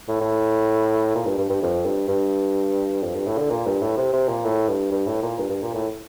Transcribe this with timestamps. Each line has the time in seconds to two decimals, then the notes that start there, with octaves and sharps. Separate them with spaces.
0.09 A2
0.21 A2
1.15 A#2
1.26 G2
1.38 G2
1.50 G2
1.62 F2
1.85 G2
2.08 G2
3.03 F2
3.15 G2
3.27 A2
3.38 D3
3.50 A#2
3.66 G2
3.82 A2
3.97 C3
4.13 C3
4.29 A#2
4.44 A2
4.68 G2
4.92 G2
5.07 A2
5.23 A#2
5.39 G2
5.50 G2
5.62 A#2
5.74 A2